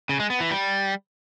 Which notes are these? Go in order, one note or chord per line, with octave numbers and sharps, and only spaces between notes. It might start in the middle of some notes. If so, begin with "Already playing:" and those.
C#3
G#3
B3
E3
G3